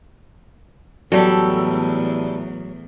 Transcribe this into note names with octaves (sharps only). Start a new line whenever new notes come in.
E2 A2 F#3 G3 A4